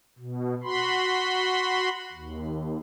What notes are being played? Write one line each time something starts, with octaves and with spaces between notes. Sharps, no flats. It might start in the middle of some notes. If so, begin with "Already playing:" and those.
B2
F#4 B5 C6
D#2